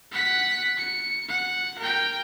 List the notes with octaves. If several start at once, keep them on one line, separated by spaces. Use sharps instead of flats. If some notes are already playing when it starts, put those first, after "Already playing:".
F#5 B6
C#7
F#5
A#4 G5